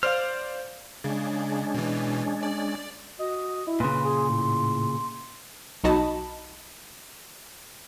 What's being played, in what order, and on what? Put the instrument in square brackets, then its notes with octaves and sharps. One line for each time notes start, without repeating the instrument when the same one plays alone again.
[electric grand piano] C5 D5 F5 [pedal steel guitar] F6
[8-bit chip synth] C#3 [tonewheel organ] G#3 C#4 D4
[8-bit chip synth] B2 E3
D5
[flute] F#4 [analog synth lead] D#5
[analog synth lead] E4
[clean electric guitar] A#2 C#3 [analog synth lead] B4 [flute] C6
[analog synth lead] G#4
A2
[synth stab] B1 D#4 F#4 D#5 A5 B5